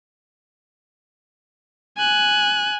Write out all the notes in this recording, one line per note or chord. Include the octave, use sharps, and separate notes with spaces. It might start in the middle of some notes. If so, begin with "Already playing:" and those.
G#5 F#6